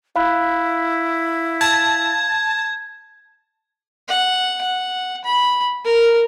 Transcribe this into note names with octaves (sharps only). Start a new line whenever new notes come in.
E4 F5 B5 F#6
A5 G#6
F#5
F#5
B5
A#4